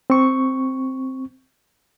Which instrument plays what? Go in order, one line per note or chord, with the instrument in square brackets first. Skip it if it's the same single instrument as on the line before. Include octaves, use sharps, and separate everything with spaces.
[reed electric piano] C4 C#6